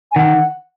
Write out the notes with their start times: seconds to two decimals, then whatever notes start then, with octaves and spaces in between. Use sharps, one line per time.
0.12 G#5
0.16 D#3 F#5